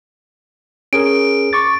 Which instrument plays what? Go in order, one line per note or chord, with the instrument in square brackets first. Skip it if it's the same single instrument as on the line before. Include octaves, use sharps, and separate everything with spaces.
[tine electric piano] C#4 G#4 A#4 [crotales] D7
[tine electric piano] C#6 D6 A6